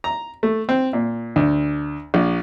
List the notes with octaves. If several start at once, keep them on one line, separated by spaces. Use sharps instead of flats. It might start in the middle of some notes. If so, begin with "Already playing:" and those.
A#5
A3
C4
A#2
D2
A#1